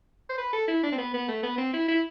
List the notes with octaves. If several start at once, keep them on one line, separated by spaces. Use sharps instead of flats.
C5
B4
A4
E4
D4
C4
B3
B3
A3
B3
C4
E4
E4